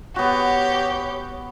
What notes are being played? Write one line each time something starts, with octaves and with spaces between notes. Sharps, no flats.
B3 F#4 G4 C#5